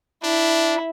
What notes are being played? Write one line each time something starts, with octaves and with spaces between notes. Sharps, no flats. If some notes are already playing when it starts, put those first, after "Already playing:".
D4 E4